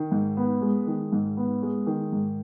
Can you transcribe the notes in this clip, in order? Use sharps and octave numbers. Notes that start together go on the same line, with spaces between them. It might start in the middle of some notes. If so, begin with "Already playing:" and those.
Already playing: D#3
G#2
B3
G#3
D#3
G#2
B3
G#3
D#3
G#2